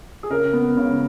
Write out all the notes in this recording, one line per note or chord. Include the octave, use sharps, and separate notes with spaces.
G#4
C#3 A#4
B3
C#3